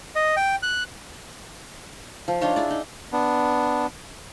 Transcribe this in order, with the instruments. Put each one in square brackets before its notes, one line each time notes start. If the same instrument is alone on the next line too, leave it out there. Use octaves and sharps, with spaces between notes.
[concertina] D#5
G5
F#6
[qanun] F3
D4 D#4 F4 C#5
E4 G#4 D5
D#4
[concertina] B3 D4